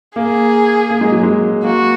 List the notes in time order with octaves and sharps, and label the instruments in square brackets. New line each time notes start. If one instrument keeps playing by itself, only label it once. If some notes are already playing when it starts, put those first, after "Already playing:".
[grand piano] A#3 [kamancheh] G#4
[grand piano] A#3
G#3
F#3
G#3
[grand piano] A#3 [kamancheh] F#4